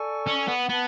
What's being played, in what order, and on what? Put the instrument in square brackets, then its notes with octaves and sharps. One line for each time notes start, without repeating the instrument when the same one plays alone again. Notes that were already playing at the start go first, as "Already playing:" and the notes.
Already playing: [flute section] A4 D5 G#5 C#6
[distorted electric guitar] C#4
B3
[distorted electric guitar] B3 [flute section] B4 F#5 A5